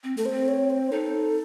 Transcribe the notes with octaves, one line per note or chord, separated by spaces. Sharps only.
C4
A3 A4
C5
C4
C#5
C5
D#4 A4